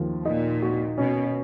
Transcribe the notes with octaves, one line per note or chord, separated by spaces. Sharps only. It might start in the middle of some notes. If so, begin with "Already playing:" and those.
Already playing: D#2 F3
A#2 D#4
F#4
B2 C#4